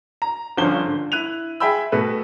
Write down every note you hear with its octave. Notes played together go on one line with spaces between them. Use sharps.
A#5
G1 G2 F3 C#4 C5 G7
D3
E4 F#6 D#7 F7
G#4 E5 G5 B5 E6
B2 A3 B4